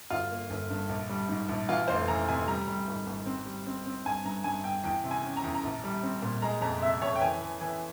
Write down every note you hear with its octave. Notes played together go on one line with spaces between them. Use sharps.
G1 F4
A#3
G1
G2
A#1
G3
G#2
A#1
E3 F4
F1 C5
E3 A#5
C3 G#5
G3 A#5
G3
G#1
G#1
C4
G3
C4
C4
G2 G#5
G2 A#5
G2 G#5
G2 G5
E2 G5
C3
G#5
C#4
A#5
E2
A#5
A#1
G3
C4
A#2
G#3 A#5
F2 A#5
C3 E5
F2 C#5
G5
E3 G#5
E3
E3